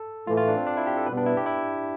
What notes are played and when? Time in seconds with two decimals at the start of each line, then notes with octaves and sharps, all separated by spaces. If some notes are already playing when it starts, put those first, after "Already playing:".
Already playing: A4
0.27 A2 E3 A3 F4
0.37 F4
0.48 D4
0.57 C4
0.67 D4
0.77 E4
0.87 G4
0.97 A4
1.06 B2 G3 B3 B4
1.17 D4
1.26 E4
1.37 G4
1.46 E4